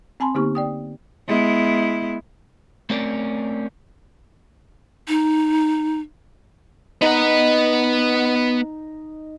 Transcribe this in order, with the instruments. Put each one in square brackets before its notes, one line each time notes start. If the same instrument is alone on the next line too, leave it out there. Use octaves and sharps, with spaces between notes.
[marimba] C4 G#5 A5 B5 C6
D3 A#3 B3 D#4 G4 C#6
D5 G5 D#6
[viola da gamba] G#3 B3 E4
[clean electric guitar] A3 C4 C#4 A#4 D5
[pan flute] D#4
[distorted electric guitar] B3 F#5 [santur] D#4 A#5